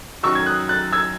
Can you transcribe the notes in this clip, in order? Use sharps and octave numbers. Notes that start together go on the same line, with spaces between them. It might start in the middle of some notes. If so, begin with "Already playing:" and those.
F#2 D#3 F#3 C#6 E6
G#6
D#6 F#6
F#6 A6
E6 G#6